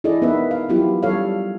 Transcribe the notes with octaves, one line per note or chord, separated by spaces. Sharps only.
E4 G#4 A4 D5 D#5
B3 D#4 A#4 B4 E5
F5
F3 F#3 B3 E4 F4 G4
G3 A4 C#5 F5